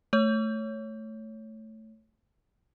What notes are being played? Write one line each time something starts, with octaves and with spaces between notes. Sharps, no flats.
A3 C#5